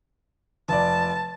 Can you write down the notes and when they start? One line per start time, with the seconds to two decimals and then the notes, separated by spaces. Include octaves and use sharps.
0.69 F1 D5 A5